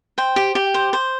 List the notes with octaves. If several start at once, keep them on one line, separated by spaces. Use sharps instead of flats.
C5 G5
G4
G4
C5
C5